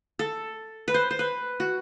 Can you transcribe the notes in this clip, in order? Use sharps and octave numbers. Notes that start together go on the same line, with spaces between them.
A4
B4
C5
C5
B4
F#4